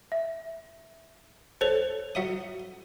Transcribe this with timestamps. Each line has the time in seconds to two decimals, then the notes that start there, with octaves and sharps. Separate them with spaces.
0.12 E5
1.61 A4 C5 C#5 F7
2.15 F#3 E5 D#6